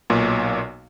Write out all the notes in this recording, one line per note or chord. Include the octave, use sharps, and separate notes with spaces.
B1 A#2